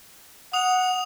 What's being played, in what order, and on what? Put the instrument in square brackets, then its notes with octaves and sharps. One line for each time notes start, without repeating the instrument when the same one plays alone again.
[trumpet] F#5 [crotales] D#6 F7